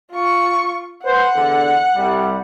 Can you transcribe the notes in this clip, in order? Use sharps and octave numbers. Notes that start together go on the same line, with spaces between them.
F4 C#6
B4 C5 F#5
E2 D3
C2 G3